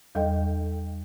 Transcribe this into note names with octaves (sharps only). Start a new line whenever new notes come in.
E2 G3 A4 D#5 G5